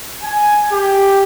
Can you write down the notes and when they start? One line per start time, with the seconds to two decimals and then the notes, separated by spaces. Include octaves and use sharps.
0.22 G#5
0.73 G4